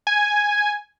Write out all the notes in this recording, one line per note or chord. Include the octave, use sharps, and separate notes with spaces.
G#5